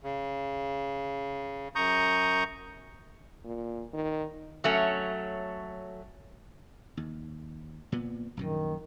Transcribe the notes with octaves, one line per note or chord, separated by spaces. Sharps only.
C#3
F#2 A#5 C#6 D#6 G6
A#2
D#3
F#3 A3 C#4
D#2
A#2 B3
A#1 F#2 A#2 D#3